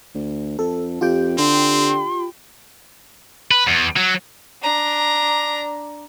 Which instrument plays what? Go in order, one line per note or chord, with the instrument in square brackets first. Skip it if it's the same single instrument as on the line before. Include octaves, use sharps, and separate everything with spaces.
[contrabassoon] D2
[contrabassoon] F2 [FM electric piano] A4
[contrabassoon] F2 [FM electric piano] F4 G4 G5
[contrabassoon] D3 [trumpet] C4 [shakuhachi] C6
[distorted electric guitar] B4
E2
F#3
[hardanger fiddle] D4 A#5